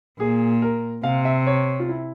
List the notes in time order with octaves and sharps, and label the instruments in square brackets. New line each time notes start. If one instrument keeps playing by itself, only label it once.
[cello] A#2 [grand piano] G#4
[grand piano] A#4
[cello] C3 [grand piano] F5
[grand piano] E5
C#5
F4
E4